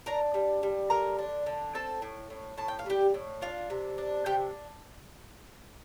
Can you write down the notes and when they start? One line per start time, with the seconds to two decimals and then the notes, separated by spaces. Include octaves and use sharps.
0.06 D4 A#4 A#5
0.34 G3
0.63 G3
0.90 D3 A#4 A#5
1.19 D4
1.46 D3
1.74 C4 A4 A5
2.02 A2
2.30 A2
2.58 A2 A5
2.68 G5
2.79 F5
2.86 G3 G4 G5
3.14 A2
3.41 D4 F4 F5
3.70 C3
3.98 D4
4.26 C3 G4 G5